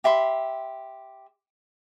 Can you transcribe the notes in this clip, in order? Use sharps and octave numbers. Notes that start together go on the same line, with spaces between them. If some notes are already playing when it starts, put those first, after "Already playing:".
G4 E5 B5 C6